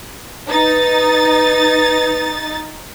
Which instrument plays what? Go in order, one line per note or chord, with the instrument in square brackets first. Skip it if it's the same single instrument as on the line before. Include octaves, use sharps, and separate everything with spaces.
[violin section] D#4 A6 [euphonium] B4